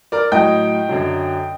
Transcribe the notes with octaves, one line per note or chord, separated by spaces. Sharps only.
A#4 D5
A2 F#3 D#5 G5
F#2 D3 F#3